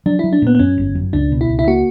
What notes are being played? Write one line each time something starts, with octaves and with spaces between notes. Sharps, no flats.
F#3 D4
E4
F#3
D4
A#2 B3
B3
F#2 C#4
G1
F#2
C#2 D4
B2
E4
C#2
E4
A#3 F#4